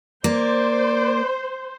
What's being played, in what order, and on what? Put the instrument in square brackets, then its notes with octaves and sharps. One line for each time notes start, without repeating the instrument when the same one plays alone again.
[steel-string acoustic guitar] A#3 [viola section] C5 [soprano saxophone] D5